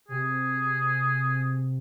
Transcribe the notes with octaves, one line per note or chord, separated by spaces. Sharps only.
C3 G#4